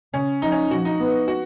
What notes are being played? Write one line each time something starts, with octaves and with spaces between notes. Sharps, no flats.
C#3 C#4
F3 D#4
C#4
F3 F#4
D#4
B3
F#4